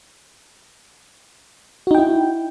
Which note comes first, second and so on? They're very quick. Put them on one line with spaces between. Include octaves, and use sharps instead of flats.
F#4 D#4 G5 E4